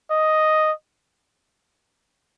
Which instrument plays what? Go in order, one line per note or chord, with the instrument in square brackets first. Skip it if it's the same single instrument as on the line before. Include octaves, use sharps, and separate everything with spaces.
[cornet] D#5